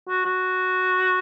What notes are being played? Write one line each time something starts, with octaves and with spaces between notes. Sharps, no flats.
F#4
F#4